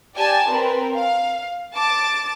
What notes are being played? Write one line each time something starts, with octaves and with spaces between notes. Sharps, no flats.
G4 D5 G#5 A5
C4 A#4 B4
F5
A5 D6 A6